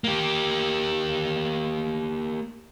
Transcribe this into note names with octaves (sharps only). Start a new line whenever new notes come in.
A#3 G4